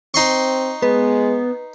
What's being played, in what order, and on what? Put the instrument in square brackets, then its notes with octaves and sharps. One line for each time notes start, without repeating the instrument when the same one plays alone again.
[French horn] C4 [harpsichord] D#4 C6 C#6
[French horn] G#3 [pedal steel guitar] B3 [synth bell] B4